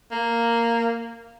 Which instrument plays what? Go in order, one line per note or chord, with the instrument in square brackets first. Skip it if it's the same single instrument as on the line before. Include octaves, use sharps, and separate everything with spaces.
[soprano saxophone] A#3